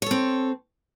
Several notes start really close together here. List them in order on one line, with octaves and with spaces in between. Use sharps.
C#5 A4 C4